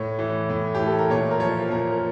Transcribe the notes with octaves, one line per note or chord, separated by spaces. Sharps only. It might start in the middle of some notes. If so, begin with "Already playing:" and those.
Already playing: A2 C#5
E3
A2
E3 G4
A4
A#4
A#2 C#5
A#4
F3 C#5
A#2 A#4
A#4